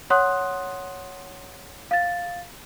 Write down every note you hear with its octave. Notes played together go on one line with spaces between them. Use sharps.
C#5 F#5 C6 D#6 F#6
F5 A6